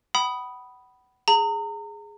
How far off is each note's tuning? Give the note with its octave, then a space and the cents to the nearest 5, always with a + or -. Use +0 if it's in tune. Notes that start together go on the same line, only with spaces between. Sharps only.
F#5 +35 B5 +0 D#6 +0
G#4 +0 A#5 -35